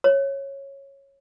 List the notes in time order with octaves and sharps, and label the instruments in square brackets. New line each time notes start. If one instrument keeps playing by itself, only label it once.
[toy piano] C#5